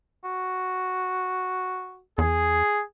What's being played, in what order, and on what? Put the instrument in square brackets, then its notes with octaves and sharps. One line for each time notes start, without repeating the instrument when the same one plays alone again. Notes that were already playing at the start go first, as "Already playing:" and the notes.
[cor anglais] F#4
[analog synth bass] E2 [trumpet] G#4